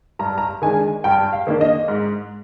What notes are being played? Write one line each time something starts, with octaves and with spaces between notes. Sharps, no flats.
G2 A#5
A#5
D#3 G#3 D4 G#5
G2 G5
F5
D#3 A#3 D4
D#5
G#2